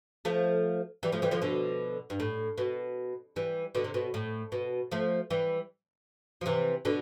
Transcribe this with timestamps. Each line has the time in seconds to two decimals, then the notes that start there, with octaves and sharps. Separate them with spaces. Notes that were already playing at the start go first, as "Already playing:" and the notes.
0.25 F3 A3
1.03 E3 G3
1.12 F3 A3
1.22 E3 G3
1.31 D3 F3
1.42 B2 D3
2.10 G2
2.20 A2
2.58 B2
3.36 E3 G3
3.75 B2 D3
3.84 C3
3.94 B2
4.14 A2
4.52 B2
4.91 F3 A3
5.30 E3 G3
6.41 F3
6.46 C3 E3
6.85 B2 D3